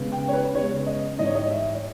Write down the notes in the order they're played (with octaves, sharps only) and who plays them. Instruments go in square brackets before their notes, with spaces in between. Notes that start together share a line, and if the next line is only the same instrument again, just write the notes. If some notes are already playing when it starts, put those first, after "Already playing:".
Already playing: [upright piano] C#3 G#3 B3
G5
C#5
B4
C#3 G#3 B3 C#5
D#5
G#2 E3 G3 D#5
C#5
D#5
E5
C#5